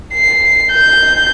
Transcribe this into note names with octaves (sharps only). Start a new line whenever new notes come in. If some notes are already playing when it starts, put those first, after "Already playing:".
C7
G6